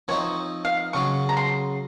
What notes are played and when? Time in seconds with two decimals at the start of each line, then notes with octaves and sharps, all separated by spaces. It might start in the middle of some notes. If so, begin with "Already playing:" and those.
0.08 F3 C4 D#4 C#5
0.65 F5
0.93 C#3 F#3 C#4 F4 C#6
1.29 A#5
1.37 C6